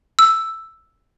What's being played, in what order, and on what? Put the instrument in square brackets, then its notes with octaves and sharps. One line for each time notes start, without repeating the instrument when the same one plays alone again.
[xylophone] E6